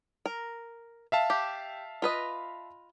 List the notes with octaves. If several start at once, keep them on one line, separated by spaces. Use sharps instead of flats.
A#4
E5 F5 A5
G4
F4 B4 D#5